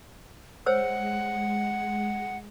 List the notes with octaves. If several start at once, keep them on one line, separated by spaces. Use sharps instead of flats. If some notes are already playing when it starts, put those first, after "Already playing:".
G#3 C5 C#5 F#5 E6